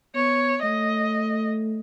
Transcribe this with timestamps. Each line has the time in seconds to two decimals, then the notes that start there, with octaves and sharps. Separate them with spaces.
0.15 B3 C#5
0.62 A3 D#5